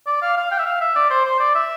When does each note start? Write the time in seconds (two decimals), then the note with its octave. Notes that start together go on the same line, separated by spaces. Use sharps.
0.07 D5
0.22 F5
0.37 F5
0.51 G5
0.59 E5
0.66 F5
0.81 E5
0.95 D5
1.10 C5
1.25 C5
1.40 D5
1.55 E5